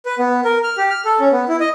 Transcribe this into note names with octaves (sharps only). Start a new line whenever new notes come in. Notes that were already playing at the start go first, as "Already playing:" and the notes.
B4
B3
A#4
F6
G4
F6
A4
C#4
B3
E4
D#5